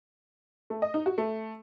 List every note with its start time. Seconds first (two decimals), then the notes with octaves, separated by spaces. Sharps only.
0.70 A3
0.82 D#5
0.94 D#4
1.06 F#4
1.18 A3